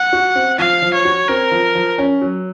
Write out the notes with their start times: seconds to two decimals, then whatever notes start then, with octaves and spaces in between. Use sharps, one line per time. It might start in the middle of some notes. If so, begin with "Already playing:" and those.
Already playing: F#5
0.13 F#4
0.36 C4
0.58 F3 F5
0.82 F3
0.94 C#5
1.05 F#4
1.29 C4 A#4
1.51 F3
1.75 F3
1.98 C#4
2.21 F#3